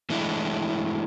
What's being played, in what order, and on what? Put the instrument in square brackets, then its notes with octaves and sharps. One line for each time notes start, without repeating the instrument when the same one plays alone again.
[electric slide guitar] E3 G#3 A3 D4 E4